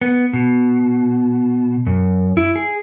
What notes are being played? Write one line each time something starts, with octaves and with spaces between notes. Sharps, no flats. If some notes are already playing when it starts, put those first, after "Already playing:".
B3
B2
F#2
E4
G#4